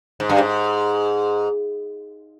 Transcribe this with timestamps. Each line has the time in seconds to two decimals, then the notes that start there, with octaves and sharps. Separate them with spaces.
0.20 G#2
0.30 G2
0.38 G#2